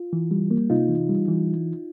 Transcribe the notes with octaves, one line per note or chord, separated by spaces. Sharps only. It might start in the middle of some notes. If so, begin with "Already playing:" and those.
Already playing: F4
E3
G3
A#3
C3 D#4 F4
E3
G3
E3